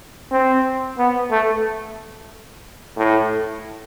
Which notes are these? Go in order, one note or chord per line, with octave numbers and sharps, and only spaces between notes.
C4
B3
A3
A2